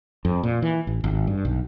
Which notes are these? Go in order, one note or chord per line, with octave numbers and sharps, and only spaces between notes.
F2
A#2
E3
A1
G#1
G2
B1